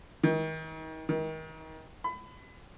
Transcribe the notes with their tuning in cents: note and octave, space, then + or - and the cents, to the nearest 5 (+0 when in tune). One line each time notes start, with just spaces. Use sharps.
D#3 +35
D#3 +30
B5 +30